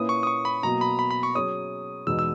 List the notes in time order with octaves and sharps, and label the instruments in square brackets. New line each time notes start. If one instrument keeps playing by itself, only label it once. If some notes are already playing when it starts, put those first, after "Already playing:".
Already playing: [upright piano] A#2 A#3 C#4 E4 B4 [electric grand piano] D#6
[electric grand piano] C#6
D#6
C#6
B5
[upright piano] B2 F#3 A#3 [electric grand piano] A#5
[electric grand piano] B5
B5
B5
C#6
[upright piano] F#3 C#4 G#4 C#5 [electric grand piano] D#6
[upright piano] E2 B2 G#3 B3 D#4 [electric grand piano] E6
[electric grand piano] E6